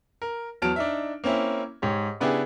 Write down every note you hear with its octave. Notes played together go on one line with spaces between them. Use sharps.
A#4
E2 F#3 A5 F6 D7
D4 D#4 E5
A#3 C4 C#4 E4
G#2 G4 C#5
C#3 B3 D4 E4 G4 G#4